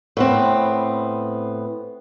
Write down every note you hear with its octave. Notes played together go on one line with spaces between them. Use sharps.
A2 B3 C4